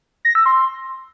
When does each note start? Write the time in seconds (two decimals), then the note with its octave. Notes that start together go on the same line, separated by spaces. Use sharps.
0.25 A#6
0.35 E6
0.46 C6